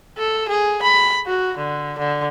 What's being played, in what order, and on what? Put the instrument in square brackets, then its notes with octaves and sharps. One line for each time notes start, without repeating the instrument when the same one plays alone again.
[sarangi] A4
G#4
B5
F#4
D3
D3